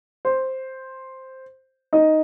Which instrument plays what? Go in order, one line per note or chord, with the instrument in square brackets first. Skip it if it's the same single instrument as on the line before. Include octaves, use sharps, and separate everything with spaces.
[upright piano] C5
D#4 D#5